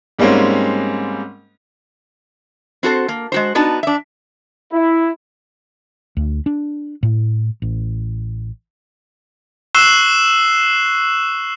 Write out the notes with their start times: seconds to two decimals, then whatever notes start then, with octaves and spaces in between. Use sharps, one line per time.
0.19 G#2 G3 G#3 A#3 C4 C#4
2.83 C4 F#4 A4 C5
3.08 A#3
3.32 G#3 F#4 C5
3.55 B3 D4 D#4 F#4 A5
3.83 D4 E5
4.72 E4
6.17 D2
6.46 D4
7.03 A2
7.62 A1
9.75 C#6 E6 F#6 C7 E7 G7